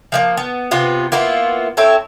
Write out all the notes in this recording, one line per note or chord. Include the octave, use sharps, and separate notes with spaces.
F3 G#3 A#3
B3
C3 B3 F4 B4
A#3 B3 E4 F4
C4 E4 A4 C#5